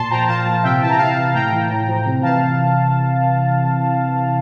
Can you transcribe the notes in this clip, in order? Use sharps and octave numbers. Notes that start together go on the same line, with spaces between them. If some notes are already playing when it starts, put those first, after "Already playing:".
Already playing: A#2 A5 C6
F3 G5 A#5
A#2 F5 A5
F3
C3 E5 G5
E3 A5
A#5
C3 F5 A5
E3
A2 G5 A#5
E3
A2
F3
C3
E3 F5 A5